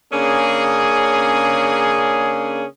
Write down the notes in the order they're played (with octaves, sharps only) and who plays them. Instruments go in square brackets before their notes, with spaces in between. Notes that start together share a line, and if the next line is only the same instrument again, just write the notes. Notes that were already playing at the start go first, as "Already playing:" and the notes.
[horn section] C#3 A#3 C#4 D4 G#4